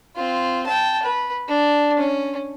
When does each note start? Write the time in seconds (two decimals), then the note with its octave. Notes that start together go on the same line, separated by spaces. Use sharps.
0.16 C4 F4
0.67 G5 A5
1.03 B4
1.48 D4
1.99 C#4